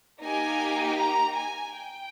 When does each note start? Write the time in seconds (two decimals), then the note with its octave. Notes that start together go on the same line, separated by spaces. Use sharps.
0.22 A#3 D#4 G4 G#5
0.98 A#5
1.37 G#5
1.75 G5